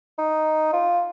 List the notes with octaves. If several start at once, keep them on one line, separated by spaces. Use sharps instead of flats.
D#4
F4